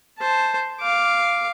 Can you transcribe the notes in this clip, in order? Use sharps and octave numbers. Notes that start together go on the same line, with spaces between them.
C5 A5
F5 D6